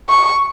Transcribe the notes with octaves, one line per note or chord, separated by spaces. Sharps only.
C#6